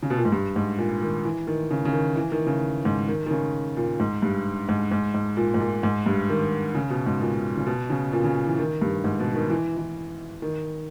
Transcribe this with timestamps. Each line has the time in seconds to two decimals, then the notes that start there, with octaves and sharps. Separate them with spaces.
0.03 C#3
0.10 B2
0.17 A#2
0.25 G#2
0.32 G2
0.56 G#2
0.78 A#2
1.02 D#3
1.25 E3
1.47 D#3
1.71 C#3
1.85 C#3
1.93 D#3
2.16 E3
2.32 D#3
2.47 C#3
2.85 G#2
3.08 D#3
3.26 D#3
3.31 C#3
3.77 A#2
4.00 G#2
4.22 G2
4.69 G#2
4.91 G#2
5.14 G#2
5.37 A#2
5.54 G#2
5.60 A#2
5.83 G#2
6.06 G2
6.29 D#3
6.75 C#3
6.90 B2
7.06 G#2
7.21 A#2
7.57 C#3
7.66 B2
7.90 C#3
8.13 A#2
8.24 C#3
8.47 E3
8.58 D#3
8.81 G2
9.04 G#2
9.20 B2
9.34 D#3
9.50 E3
9.77 E3
10.42 D#3